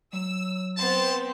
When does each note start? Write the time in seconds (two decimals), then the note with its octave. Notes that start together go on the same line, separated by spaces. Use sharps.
0.13 F#3 E6
0.77 B3 C4 C5 A5